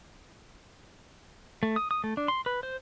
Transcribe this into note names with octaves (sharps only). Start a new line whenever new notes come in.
A3
D#6
D#6
A3
D4
C6
B4
C5